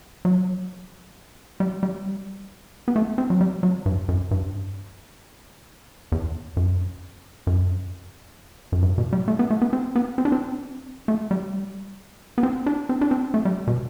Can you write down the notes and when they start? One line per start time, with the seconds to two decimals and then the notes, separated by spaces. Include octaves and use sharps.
0.25 F#3
1.60 G3
1.83 G3
2.88 B3
2.96 A3
3.18 C4
3.30 F#3
3.41 G3
3.63 F#3
3.86 G2
4.08 F#2
4.31 G2
6.12 E2
6.57 F#2
7.47 F#2
8.72 F#2
8.82 G2
8.98 B2
9.13 G3
9.28 A3
9.39 B3
9.50 A3
9.62 B3
9.73 C4
9.95 B3
10.18 C4
10.25 D4
10.32 C4
11.08 A3
11.31 G3
12.38 B3
12.43 C4
12.66 D4
12.89 C4
13.01 D4
13.11 C4
13.34 A3
13.45 G3
13.67 B2